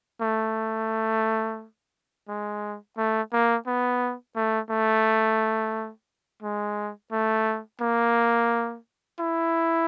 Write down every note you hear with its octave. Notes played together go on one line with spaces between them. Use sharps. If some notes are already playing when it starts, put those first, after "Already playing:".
A3
G#3
A3
A#3
B3
A3
A3
G#3
A3
A#3
E4